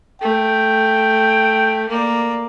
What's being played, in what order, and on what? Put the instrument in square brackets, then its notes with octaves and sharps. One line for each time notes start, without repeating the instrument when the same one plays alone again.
[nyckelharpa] A3 [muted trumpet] G5
[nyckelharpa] A#3 D5